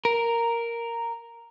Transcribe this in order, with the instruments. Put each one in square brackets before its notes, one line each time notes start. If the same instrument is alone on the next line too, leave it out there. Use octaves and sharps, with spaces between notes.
[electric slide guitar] A#4